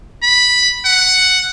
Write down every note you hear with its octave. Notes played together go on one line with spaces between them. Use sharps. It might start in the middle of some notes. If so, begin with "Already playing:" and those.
B5
F#5